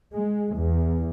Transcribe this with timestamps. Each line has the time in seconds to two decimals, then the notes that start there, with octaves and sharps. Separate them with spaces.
0.14 G#3
0.55 E2